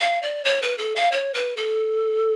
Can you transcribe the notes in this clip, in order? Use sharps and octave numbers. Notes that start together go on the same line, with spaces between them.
F5
D5
C#5
B4
A4
F5
C#5
B4
A4